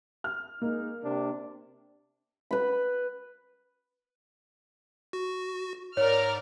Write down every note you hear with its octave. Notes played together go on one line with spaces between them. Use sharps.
F6
G#3 A#3 D#4
C3 D4
B4 B5
F#4
G#2 A#4 C#5 D5 F6